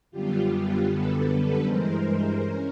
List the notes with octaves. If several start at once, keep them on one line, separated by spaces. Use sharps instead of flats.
F#2 D3 G3 B3 F4 G4
F#2 D3 G3 B3 A4 B4
G2 E3 G#3 A#4 C5
C#4 A#4